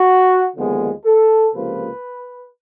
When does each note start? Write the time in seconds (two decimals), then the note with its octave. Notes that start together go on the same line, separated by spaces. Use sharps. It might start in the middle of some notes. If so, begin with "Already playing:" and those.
Already playing: F#4
0.56 D#2 D3 F3 G#3 B3
1.05 A4
1.55 C#2 C3 F3 A#3 B4